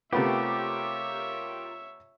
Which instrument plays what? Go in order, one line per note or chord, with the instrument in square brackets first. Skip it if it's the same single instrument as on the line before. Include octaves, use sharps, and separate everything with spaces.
[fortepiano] C3 A3 B3 [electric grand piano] F4 A#4 [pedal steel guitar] G4 [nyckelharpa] C#5 E5